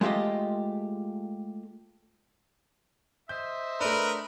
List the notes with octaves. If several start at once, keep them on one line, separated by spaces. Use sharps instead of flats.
G#3 A3 F4 G4 D#5
C5 D#5 E5 G6
A3 D4 A#4 B4